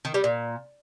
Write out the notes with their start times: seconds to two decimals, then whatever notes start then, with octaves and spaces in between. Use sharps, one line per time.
0.05 D#3
0.14 G3
0.24 A#2